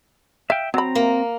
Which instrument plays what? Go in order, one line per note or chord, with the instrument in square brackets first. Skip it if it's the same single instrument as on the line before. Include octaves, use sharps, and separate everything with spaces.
[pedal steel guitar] E5 G5 [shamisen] F5
[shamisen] F#3 B5 [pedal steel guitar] C4 A#5
[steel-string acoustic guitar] A#3